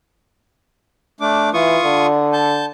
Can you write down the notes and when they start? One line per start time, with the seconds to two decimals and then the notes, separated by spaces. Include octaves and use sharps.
1.21 A3 D4 D6
1.54 E3 F4 C#6 D#6
1.85 D3
2.33 A5 G6